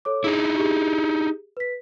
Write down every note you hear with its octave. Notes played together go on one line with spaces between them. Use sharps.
A4 C#5 D6
D#4 E4 G#4
G4 G#4
B4 B6